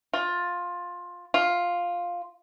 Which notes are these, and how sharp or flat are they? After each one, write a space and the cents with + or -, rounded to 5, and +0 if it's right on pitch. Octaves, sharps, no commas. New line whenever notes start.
F4 +15
F4 +5